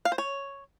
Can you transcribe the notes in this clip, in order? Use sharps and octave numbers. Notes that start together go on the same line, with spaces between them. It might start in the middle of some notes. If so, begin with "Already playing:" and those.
F5
C5
C#5